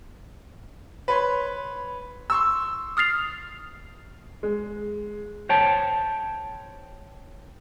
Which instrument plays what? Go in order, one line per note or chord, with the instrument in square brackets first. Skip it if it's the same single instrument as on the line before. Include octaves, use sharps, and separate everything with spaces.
[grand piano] B4 C#5 C6
C6 C#6 E6
[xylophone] D#6 F6 A6 C7 F7
[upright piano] G#3
[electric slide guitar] C5 C#5 G5 A5